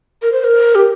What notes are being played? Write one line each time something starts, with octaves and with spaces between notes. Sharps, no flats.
A#4
C5
A#4
G4